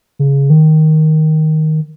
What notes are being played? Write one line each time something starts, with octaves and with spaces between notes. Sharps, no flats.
C#3
D#3